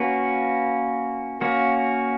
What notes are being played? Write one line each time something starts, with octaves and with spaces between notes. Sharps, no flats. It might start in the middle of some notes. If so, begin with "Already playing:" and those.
Already playing: A#3 C#4 F#4 B4
A#3 C#4 F#4